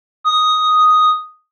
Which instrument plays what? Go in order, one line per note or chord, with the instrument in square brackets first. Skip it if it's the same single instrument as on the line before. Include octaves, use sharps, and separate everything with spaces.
[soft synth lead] D#6